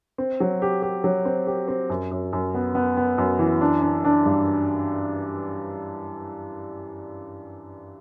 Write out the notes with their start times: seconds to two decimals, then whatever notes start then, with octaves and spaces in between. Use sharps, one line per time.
0.18 C4
0.40 F#3
0.62 G4
0.82 G4
1.04 F#3
1.25 C4
1.47 G4
1.68 C4
1.90 F#2
2.11 F#2
2.33 F#2
2.54 B3
2.75 B3
2.97 B3
3.18 F#2
3.39 E3
3.61 D4
3.82 D4
4.05 D4
4.26 G2